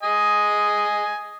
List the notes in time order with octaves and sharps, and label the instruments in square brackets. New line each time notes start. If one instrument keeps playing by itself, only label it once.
[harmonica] D#5 G#5